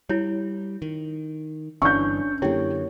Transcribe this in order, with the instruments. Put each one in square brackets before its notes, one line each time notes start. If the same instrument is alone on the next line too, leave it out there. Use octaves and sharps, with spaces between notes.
[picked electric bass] G3 [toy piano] E4 C#5
[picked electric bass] D#3
[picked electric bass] G1 G2 E3 [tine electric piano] C#4 D4 [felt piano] C#6 G6
[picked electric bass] F#2 D3 [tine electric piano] A#3 C#5 [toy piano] E4 [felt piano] G4